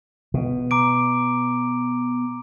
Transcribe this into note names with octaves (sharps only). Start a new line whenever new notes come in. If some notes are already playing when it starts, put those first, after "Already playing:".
B2
A#5 D6 D7